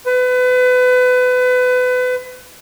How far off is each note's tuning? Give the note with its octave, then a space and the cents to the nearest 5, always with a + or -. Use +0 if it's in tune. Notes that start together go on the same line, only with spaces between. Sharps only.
B4 +30